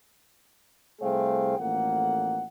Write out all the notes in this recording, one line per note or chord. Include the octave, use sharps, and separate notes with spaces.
C2 A3 G#4 C5 F5 G5
A1 F2 A#3 F#5